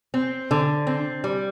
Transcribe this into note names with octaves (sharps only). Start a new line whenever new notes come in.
C4
D3
C4
G3